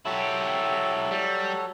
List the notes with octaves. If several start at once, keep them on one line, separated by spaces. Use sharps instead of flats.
F#3 E4 G4 A4
G3